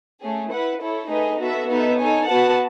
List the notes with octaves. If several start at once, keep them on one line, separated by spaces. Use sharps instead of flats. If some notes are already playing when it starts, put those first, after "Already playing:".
A3 C#4 G#4
E4 B4 F#5
E4 A4 C#5
A3 D#4 G#4 B4 D#5
B3 F#4 A4 E5
B3 D#4 A4 E5
D#4 A4 C#5 G#5
B3 F#4 B4 F#5 A5